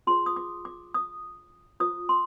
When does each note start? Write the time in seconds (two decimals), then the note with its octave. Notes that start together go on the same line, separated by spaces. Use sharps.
0.07 F4 G#4 C5 C6
0.26 D#6
0.36 D6
0.65 D6
0.94 D#6
1.80 F4 C5 D#6
2.09 C6